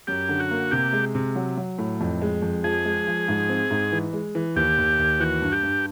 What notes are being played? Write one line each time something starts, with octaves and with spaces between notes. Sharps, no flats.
F#2 G4
D3
F#4
A#3
C3 G4
G#3
C3
F#3
F#3
A2
F2
G#3
F2
F3 G#4
G#3
F3
G#2
C4
G#2
E3
G#3
E3
D#2 G4
D#2
D#2
E3 F#4
G2
G4
G2